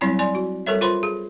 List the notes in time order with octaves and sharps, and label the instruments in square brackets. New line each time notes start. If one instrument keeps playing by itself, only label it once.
[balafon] F#3 G3 C4 E4 G#5 A#5
D5 G#5 C6
F#4
G3 A4 A#4 C#5 E5
F4 A#4 C5 B5 C6
G#4